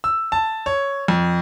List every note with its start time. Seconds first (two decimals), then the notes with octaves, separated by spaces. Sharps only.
0.04 E6
0.32 A5
0.66 C#5
1.08 F2